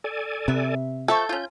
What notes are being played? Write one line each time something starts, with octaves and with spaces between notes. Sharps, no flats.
A4 D5 G#5
C3 B3 E5
F3 A4 E5 C#6 G6
C#4 F4